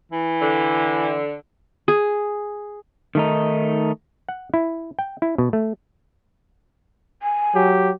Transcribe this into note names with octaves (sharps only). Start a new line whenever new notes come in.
E3
D3
G#4
D#3 A3 D#4
F#5
E4
G5
E4
B2
A3
G#5
F#3 G4